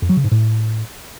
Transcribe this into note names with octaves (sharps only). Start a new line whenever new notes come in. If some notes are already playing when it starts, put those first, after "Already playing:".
F2
F#3
C#3
G#2
A2